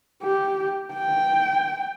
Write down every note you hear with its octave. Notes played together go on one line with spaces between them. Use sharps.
G4
G5